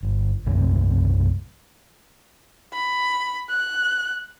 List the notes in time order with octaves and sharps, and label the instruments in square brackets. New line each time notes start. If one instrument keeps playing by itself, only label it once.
[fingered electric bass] G1
B1 F#2 A2 C3
[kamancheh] B5
F#6